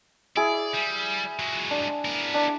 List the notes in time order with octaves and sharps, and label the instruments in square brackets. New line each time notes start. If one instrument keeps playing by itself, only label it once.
[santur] E4 G#4 [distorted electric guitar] D5
[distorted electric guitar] G3
F#3 G#3
[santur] D4
[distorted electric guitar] B3 A#4
[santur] D4